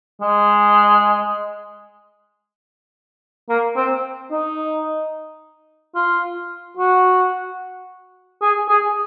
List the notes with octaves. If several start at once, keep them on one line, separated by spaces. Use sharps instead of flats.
G#3
A#3
C4
D#4
F4
F#4
G#4
G#4